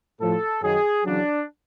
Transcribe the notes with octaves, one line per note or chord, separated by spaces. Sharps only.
A2 F3 A4
F#2 D#3 F#3 G#4
E2 C#3 F#3 D4